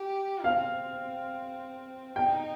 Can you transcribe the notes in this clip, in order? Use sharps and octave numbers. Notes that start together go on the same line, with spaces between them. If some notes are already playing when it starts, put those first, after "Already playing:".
Already playing: G4
C4 F5
D#4 G5